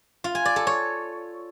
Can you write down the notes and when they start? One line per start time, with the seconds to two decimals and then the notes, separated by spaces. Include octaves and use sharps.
0.24 F4
0.35 G#5
0.45 D5
0.56 A4
0.67 C#5